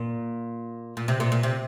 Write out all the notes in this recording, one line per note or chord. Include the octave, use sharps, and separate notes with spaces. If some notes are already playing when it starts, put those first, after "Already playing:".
Already playing: A#2
A#2
C3
A#2
A#2
C3